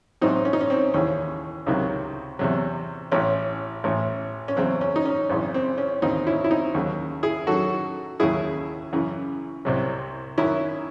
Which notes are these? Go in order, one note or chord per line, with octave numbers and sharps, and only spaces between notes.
A1 G#2 F#3 C4 D#4
C#4
D#4
C#4
C4
D#2 C#3 E3 C#4
C#2 C3 D#3 F#3
E2 C3 F#3
A1 A2 E3 C#4
A1 A2 E3
C#4
E2 C#3 F#3 C4
C#4
D#4
C#4
G#1 F#2 C#3 E3
C4
C#4
D#2 C#3 E3 C4 D#4
C#4 E4
E4
C4 D#4
D#2 C#3 F#3
E4 G#4
F#2 D#3 F#3 F#4 A4
D#2 C#3 F#3 E4 G#4
F#2 C#3 E3
C2 C3 F#3
F#2 D#3 F#3 C#4 E4